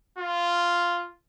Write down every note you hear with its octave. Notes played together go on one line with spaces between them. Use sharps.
F4